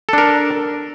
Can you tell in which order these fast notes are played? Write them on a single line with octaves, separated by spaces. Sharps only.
A4 D4 A#4